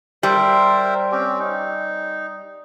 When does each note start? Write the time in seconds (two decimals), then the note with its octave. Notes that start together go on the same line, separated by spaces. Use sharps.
0.23 G3 A#4 C5 E5
1.12 C4 C#4 G4
1.39 D#4